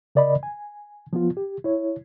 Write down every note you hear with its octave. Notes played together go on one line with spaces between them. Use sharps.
C#3 A#4 D5 D#5 B5
G#5
F3 B3 F4
G4
E4 C#5